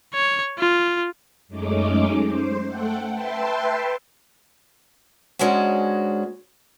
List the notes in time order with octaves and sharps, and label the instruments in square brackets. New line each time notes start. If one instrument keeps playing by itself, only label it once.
[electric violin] C#5
F4
[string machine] F#2 G#3 A3 C#4 D#4 D6
C5
A3 A4 F#5 G5
B4 E5 G5 A5 C6
[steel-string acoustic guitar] G#2 G#3 C#4 D4 F#4